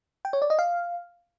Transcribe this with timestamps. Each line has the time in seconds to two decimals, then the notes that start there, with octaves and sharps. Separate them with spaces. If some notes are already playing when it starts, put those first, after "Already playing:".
0.25 G5
0.33 C#5
0.42 D5
0.50 D#5
0.59 F5